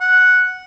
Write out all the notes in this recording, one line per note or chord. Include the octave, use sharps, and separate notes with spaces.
F#5